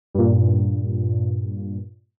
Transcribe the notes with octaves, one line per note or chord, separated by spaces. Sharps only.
G2 A#2